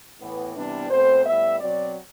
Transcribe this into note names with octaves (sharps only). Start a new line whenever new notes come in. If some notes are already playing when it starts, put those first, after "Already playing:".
A2 E3 B3
C3 E3 G3 B3 D4
B2 A3 C4 C5
A2 G3 B3 E5
B2 F#3 C4 D5